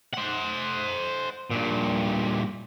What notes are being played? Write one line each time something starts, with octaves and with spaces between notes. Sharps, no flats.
C5 F#5
G2 A#2